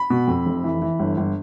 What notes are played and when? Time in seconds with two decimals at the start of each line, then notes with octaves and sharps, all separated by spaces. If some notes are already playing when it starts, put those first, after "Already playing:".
Already playing: B5
0.10 B2
0.28 F2
0.46 F1
0.64 E3
0.82 E3
1.00 G1
1.17 G1